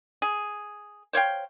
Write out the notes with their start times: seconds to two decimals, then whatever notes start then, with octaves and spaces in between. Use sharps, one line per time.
0.22 G#4
1.13 C5 C#5 F5 G5